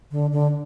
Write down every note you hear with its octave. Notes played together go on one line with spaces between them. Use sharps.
D3
D3